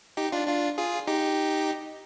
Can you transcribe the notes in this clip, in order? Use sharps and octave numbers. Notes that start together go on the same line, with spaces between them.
D#4 G4
D4 F4
D4 F4
F4 G#4
D#4 G4